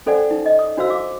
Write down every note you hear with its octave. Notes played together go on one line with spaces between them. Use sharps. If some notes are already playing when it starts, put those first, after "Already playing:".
C#4 A4 C5 D5 F#5 G#5
D#4
D#5
D#6
D4 F#4 C5 F5 E6
F5 D6